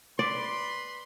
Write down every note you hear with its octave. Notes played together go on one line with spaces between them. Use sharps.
B4 D5 B5 C6